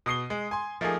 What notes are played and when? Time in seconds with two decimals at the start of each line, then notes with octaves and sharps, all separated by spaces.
0.06 B2 D#6 C7 G7
0.30 G#3
0.51 G#5 C6
0.81 F3 A3 A#3 D#4 G#4